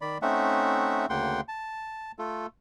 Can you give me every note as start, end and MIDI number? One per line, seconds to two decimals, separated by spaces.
0.01 0.18 51
0.01 0.18 74
0.01 0.18 83
0.22 1.06 57
0.22 1.06 60
0.22 1.06 61
0.22 1.06 63
0.22 1.06 76
0.22 1.06 78
1.10 1.41 38
1.10 1.41 49
1.10 1.41 58
1.10 1.41 78
1.10 1.41 79
1.10 1.41 84
1.48 2.12 81
2.19 2.46 57
2.19 2.46 65
2.19 2.46 69